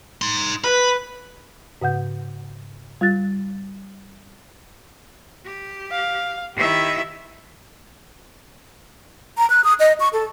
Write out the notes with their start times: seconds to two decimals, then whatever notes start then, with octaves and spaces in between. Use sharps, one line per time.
0.22 D#4 C6
0.64 B4 B5
1.82 G#2 C#3 F#5 G6
3.01 G3 F4 F#6 A6
5.46 G4
5.91 F5
6.56 D#3 E4 G4 E5
9.38 A#5
9.50 F#6
9.64 D#6
9.80 D#5
10.00 C#6
10.13 A4